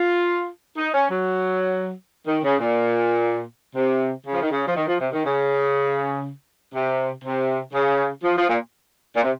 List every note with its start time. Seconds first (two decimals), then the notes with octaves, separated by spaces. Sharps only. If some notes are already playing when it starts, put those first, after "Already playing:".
Already playing: F4
0.77 D#4
0.94 C#4
1.10 F#3
2.26 D#3
2.43 C#3
2.60 A#2
3.76 C3
4.26 C#3
4.34 F3
4.42 D#3
4.51 C#3
4.66 F3
4.75 D#3
4.87 F3
4.99 C3
5.13 D#3
5.25 C#3
6.74 C3
7.24 C3
7.73 C#3
8.24 F3
8.36 F3
8.48 A#2
9.16 A#2
9.23 C3